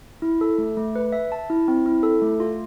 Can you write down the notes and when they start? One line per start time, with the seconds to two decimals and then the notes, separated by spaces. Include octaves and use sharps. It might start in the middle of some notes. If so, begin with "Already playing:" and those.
0.22 E4
0.41 A4
0.58 A3
0.77 A3
0.95 B4
1.12 E5
1.32 A5
1.50 E4
1.68 C4
1.86 E4
2.03 A4
2.22 A3
2.40 F4